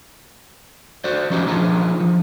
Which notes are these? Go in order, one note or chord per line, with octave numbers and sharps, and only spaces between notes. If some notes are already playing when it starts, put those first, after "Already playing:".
F#4 C5 D5
F3 F#3 C#4 D#4 G4 C5
F3 D4 D#4 F4 G#4
F3